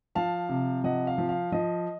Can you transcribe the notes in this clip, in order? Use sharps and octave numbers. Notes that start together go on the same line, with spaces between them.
F3 F5 A5
C3
F3 D#5 F#5
F5
F3
F5
F3 D#5